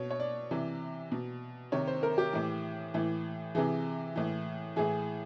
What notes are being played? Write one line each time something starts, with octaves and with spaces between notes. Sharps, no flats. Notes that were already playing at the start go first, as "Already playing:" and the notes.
Already playing: B2 C#5
C#5
D5
C3 E3
B2
C3 D#3 C#5
C5
A#4
G4
A2 E3
A2 E3
C3 E3 G#4
A2 E3
A2 E3 G#4